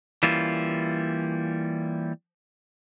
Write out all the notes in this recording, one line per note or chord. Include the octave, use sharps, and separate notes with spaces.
E3 G3 A#3 C#4 E4 F4